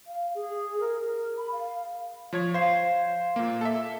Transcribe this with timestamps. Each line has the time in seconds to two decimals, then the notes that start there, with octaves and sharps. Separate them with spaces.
0.07 F5
0.35 G#4
0.80 A#4
1.38 B5
1.52 F5
2.33 F3 C#5 G#6
2.54 C5 F5 C7
3.36 A#2 A#3
3.61 A4 E5